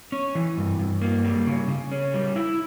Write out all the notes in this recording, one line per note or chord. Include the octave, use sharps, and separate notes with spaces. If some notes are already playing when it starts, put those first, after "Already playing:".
C#4
E3
G2
G2
A#3
G3
C#3
C#3
C#4
G3
E4